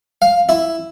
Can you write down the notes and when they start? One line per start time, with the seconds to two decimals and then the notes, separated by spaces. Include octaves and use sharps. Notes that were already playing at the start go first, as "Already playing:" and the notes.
0.22 F5
0.49 E4